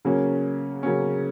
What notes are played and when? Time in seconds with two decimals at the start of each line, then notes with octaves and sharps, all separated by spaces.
0.05 C#3 F#3 A#3 C#4
0.83 C#3 F#3 A#3 C#4